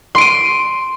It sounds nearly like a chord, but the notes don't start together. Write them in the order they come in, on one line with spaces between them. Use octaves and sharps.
C6 D7 D#7